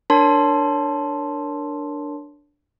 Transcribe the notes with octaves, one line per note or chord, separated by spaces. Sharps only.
D4 A#4 C#5 A5 C6